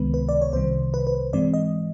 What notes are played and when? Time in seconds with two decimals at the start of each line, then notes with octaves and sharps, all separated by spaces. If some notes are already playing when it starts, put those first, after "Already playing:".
Already playing: C#2 C3 D#3 G#3 B3 B4
0.14 B4
0.29 D5
0.41 C#5
0.53 C2 C3 D#3 G3 C5
0.94 B4
1.07 B4
1.33 G#2 E3 G#3 C4 D5
1.54 D#5